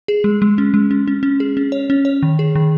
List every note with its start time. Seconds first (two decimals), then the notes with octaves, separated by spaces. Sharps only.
0.08 G#4
0.24 G#3
0.42 G#3
0.58 C#4
0.74 G#3
0.91 C#4
1.07 C#4
1.23 C#4
1.40 G#4
1.57 C#4
1.72 C#5
1.90 C#4
2.05 C#5
2.23 D#3
2.39 G#4
2.55 D#3